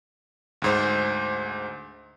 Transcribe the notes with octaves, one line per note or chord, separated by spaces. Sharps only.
D2 G#2 C5